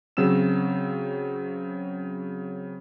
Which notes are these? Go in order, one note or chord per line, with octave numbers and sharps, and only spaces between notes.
C#3 F#3 C4 E6 E7